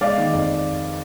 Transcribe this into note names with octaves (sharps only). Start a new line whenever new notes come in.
G#3 D5 F5
D#3
F2